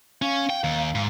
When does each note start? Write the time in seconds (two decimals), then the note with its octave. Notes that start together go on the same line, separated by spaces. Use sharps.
0.22 C#4 F5
0.50 G5
0.64 D#2
0.95 G#2